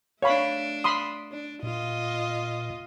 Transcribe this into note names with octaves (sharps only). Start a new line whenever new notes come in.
A3 D4 C#5 F5 B5
B5 C6 D#6
D4
A#2 F4 D#5